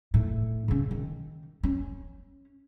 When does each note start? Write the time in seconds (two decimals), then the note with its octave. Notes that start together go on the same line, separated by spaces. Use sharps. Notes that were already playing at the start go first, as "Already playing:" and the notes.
0.14 A2
0.68 C#3 C#4
0.91 D#3
1.64 C#4